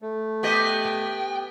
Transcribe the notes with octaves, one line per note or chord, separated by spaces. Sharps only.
A3
B3 G4 D#5
G5